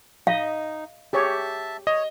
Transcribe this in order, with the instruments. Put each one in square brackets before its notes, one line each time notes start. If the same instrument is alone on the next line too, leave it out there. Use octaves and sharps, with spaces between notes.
[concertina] D#4 [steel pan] D#5 [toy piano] F5
[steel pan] G4 G#4 C#5 [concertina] E5 A5
[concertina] C#5 [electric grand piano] D#5